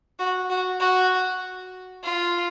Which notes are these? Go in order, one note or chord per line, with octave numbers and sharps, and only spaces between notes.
F#4
F#4
F#4
F4